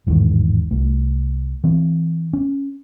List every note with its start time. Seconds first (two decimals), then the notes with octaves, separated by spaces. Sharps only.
0.07 A1 E2 G#2 D#3
0.71 C2 A3
1.64 E3 C4
2.33 C#4